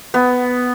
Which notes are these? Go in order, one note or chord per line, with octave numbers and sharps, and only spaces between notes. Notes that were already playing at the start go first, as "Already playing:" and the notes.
B3